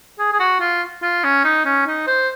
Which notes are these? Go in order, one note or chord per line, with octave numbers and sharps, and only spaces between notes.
G#4
G#4
F#4
F4
F4
C#4
D#4
C#4
D#4
C5